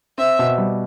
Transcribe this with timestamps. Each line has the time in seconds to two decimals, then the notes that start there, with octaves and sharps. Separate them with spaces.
0.18 C4 E5
0.39 B2
0.58 G3